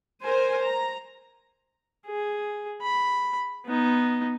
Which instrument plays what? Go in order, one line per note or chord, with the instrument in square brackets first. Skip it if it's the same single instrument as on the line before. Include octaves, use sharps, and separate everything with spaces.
[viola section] A#4 C5 G#5
A#5
[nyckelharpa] G#4
B5
B3 D#4